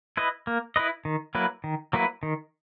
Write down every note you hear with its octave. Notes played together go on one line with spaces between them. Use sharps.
E4 B4 D#5
A#3
E4 B4 D#5
D#3
F#3 A#3 E4 B4
D#3
F#3 A#3 E4 B4
D#3